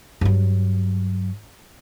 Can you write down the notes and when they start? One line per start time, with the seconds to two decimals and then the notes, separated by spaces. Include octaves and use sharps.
0.21 G2 F#3